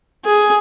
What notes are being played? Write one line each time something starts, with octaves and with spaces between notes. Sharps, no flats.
G#4